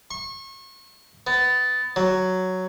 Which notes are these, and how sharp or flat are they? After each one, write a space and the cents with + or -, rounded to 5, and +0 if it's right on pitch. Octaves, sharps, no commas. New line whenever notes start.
C#6 -35
B3 +25
F#3 +5